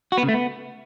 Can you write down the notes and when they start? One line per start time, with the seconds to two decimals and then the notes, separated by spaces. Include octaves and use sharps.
0.12 F#4
0.18 B3
0.23 C#3
0.29 A3
0.34 B3